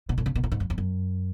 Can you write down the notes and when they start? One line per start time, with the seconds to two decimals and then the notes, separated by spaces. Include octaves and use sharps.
0.09 B2
0.18 A2
0.26 C#3
0.35 B2
0.44 A2
0.52 G#2
0.60 F#2
0.70 E2
0.78 F#2